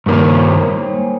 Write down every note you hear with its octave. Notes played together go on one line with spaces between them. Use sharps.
G2 D#3 A#3 C5
C#5
C5
D#4
G3
A#3
G#3